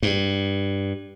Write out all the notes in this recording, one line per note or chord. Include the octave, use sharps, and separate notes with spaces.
G2